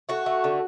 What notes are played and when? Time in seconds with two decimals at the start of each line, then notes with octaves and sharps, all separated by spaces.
0.09 A3 F#4
0.26 A3
0.44 D3